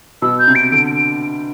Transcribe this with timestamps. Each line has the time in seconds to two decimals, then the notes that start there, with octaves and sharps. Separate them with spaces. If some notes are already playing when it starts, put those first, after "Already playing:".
0.22 B2 E6
0.39 G6
0.47 C3
0.55 D7
0.72 D3 D7
0.96 D7